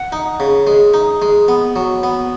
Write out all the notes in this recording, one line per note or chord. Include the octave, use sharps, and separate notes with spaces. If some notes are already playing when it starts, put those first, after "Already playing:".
Already playing: F#5
D#4
C#3
G#3
D#4
G#3
B3
F#3
B3